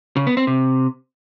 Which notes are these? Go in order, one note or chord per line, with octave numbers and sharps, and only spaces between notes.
C#3
B3
C4
C3